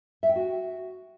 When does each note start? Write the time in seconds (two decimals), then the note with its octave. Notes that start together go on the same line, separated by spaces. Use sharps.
0.23 E5
0.29 G5
0.36 F#4